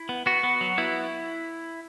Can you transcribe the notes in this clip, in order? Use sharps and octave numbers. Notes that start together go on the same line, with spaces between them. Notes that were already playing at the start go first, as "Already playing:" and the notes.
Already playing: E4
B3
B3 F#4
B3
F#3
B3 E4